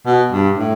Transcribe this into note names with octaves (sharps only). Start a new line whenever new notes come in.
B2
G2
A2